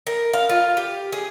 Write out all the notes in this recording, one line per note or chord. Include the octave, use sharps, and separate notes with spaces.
A#4
F5
F4
G4
G#4